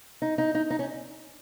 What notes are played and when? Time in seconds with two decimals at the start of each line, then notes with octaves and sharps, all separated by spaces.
0.22 D#4
0.38 D#4
0.55 D#4
0.70 D#4
0.79 C#4